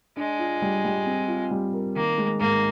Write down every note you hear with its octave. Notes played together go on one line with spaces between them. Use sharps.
G#3 D4
F4
G3
G3
C4
F4
G3
A#4
D#3 A#3
G#3
G#2 A#3